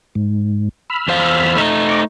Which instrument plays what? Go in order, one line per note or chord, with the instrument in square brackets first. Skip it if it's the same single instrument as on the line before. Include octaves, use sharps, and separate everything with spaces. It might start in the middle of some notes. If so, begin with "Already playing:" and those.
[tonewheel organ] G#2
B5 E6 F6
[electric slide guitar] E2 C5 F5
A3 D#4
[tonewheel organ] A#5 C#6 D6